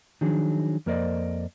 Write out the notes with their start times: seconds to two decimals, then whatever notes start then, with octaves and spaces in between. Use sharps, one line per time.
0.21 D#3 F3 F#3 D4 G#4
0.86 F2 A#3 A#4 C5 D5 D#5